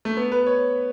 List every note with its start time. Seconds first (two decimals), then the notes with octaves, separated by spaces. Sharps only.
0.05 A3
0.17 B3
0.32 B4
0.46 C#5